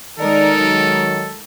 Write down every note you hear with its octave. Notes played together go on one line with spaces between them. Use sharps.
D#3 G#3 D#4 A4 A#4 D5
D#3 F#3